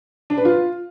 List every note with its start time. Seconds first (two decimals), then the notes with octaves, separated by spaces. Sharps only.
0.30 D4
0.38 B4
0.45 F4